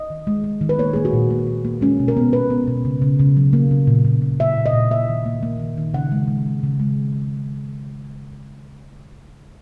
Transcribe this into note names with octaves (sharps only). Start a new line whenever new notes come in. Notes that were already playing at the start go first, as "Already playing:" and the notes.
Already playing: D#5
D#3
G#3
G#3
D#3
B4
A#3 C#5
A#3 G#4
F#4
A#2
A#3
A#3
A#3
G#3 C#4
B2
A#4
B3
B3 B4
B3
B2
C#3
C#3
C#3
F#3
A#3
C#3
A#2
A#2
A#2
A#3 E5
A#2
D#5
A#2
A#3 E5
D#3
A#3
A#3
D#3
D#3
C#3 F#5
G#3
G#3
G#3
C#3
G#3